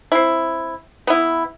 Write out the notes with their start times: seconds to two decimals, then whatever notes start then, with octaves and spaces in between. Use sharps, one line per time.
0.12 C4 E4
1.07 B3 E4